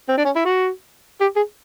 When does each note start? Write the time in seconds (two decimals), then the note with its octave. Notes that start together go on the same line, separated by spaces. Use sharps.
0.09 C4
0.17 D4
0.25 C#4
0.36 E4
0.45 F#4
1.21 G4
1.36 G#4